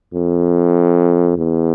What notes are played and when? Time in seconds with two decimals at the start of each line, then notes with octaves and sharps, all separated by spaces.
0.14 F2
1.38 E2